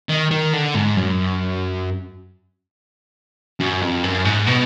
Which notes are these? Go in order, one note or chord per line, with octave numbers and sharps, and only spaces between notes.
D#3
D#3
D3
G#2
F#2
F#2
F2
F#2
G#2
B2